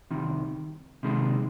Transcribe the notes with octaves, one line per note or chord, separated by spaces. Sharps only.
C2 C3 D#3
C3 D#3 G#3